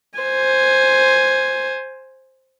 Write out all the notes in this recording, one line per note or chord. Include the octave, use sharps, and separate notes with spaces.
C5 G#5